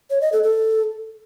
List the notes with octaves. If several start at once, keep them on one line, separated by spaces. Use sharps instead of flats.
C#5
D#5
A4
A4